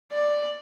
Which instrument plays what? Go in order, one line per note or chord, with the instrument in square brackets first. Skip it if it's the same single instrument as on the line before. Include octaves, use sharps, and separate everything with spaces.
[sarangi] D5